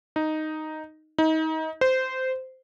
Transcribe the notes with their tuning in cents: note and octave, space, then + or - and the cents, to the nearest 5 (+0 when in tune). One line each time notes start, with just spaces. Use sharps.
D#4 +0
D#4 +30
C5 -15